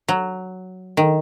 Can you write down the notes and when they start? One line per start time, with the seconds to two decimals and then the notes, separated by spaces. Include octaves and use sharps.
0.08 F#3
0.97 D#3